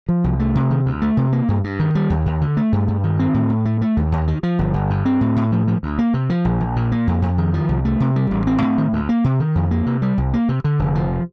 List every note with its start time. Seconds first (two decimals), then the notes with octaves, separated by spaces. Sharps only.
0.09 F3
0.24 C2
0.40 A3
0.55 C3
0.70 D#3
0.86 D2
1.02 A3
1.17 C3
1.32 A#3
1.48 G2
1.64 G2
1.79 D#3
1.95 G3
2.10 D#2
2.26 D#2
2.41 D3
2.57 A3
2.72 G2
2.88 G2
3.04 D#3
3.19 C4
3.34 A2
3.50 A2
3.65 A3
3.81 A3
3.97 D#2
4.12 D#2
4.28 D#3
4.43 F3
4.59 G1
4.74 G1
4.90 G2
5.05 C4
5.21 A2
5.36 A2
5.52 F3
5.67 F3
5.83 D2
5.99 A#3
6.14 C3
6.30 F3
6.45 A#1
6.61 A#1
6.76 A#2
6.92 A#3
7.07 F2
7.22 F2
7.38 D#3
7.54 F3
7.69 C2
7.85 A3
8.00 C3
8.16 G3
8.31 A1
8.47 C4
8.62 A2
8.78 D#3
8.93 D2
9.09 A#3
9.24 C3
9.40 D#3
9.55 F2
9.71 A#3
9.86 C3
10.02 G3
10.18 C2
10.34 A#3
10.49 C3
10.64 D3
10.79 F1
10.95 F3